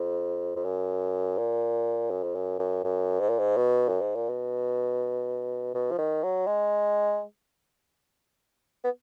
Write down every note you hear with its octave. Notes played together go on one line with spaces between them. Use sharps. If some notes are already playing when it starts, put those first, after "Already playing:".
Already playing: F2
F2
F#2
A#2
F#2
F2
F#2
F#2
F#2
G#2
A#2
G#2
B2
F#2
G#2
A#2
B2
B2
F3
D#3
F#3
G#3
B3